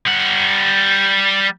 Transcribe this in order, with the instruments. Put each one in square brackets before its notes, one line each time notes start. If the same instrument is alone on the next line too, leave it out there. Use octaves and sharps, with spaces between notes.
[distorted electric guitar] G3 F#5